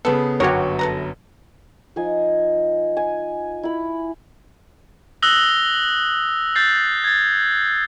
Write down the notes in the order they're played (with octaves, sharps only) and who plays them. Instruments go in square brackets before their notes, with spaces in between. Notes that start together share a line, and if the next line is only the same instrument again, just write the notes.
[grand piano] C#3 B3 [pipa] A4 B4
[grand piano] G1 F#2 [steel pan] F#4 C#5 [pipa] G4 A#4
[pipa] A4 B4 A#5
[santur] F3 D#4 D#5 G#5
G#5
E4 B5
[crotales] D#6 E6 F#6 A#6 G7
G6 A6 C7
G#6 A6